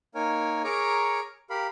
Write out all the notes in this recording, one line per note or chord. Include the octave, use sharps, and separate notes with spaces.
A#3 D#4 A#4 C#5 G#5
G#4 A#4 C#5 A#5 C#6 D6
G4 A#4 F5 B5